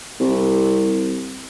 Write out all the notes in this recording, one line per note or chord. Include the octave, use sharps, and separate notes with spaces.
C2